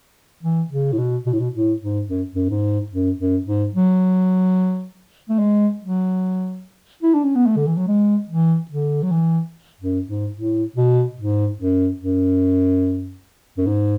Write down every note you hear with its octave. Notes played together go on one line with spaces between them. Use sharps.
E3
C#3
A2
B2
B2
A2
B2
A2
G#2
F#2
F#2
G#2
F#2
F#2
G#2
F#3
A3
G#3
F#3
E4
D4
C#4
B3
A3
D3
E3
F#3
G#3
E3
D3
F#3
E3
F#2
G#2
A2
B2
G#2
F#2
F#2
F#2
G#2